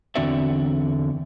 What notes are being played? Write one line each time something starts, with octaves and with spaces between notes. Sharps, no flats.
E2 D3 C4 F#4 D5 E5